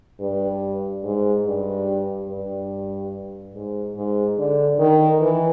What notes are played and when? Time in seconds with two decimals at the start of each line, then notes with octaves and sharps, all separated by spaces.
0.20 G2
1.04 G#2
1.45 G2
2.28 G2
3.54 G#2
3.95 G#2
4.37 D3
4.79 D#3
5.21 E3